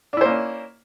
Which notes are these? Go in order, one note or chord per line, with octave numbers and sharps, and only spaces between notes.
A#3 C#4 D4 E4 C5